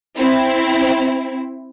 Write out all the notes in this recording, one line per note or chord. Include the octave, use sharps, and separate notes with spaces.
C4 E4